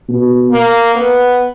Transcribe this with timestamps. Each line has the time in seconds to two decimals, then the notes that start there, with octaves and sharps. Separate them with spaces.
0.09 B2
0.52 A#3
0.95 B3